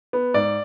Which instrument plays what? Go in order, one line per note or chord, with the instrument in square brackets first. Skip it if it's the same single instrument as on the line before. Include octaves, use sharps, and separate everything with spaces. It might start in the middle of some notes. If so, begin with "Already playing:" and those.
[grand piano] B3
G#2 D5